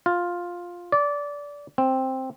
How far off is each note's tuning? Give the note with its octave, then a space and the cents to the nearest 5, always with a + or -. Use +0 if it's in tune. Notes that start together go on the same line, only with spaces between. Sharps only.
F4 +5
D5 -20
C4 +5